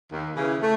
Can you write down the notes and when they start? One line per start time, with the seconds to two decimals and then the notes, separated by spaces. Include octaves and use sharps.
0.12 D#2
0.35 C#3 E3
0.61 A3